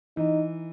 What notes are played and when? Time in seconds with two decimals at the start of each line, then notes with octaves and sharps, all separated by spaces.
0.17 E3 D#4